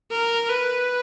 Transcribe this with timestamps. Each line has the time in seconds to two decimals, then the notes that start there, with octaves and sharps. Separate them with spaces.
0.11 A#4
0.49 B4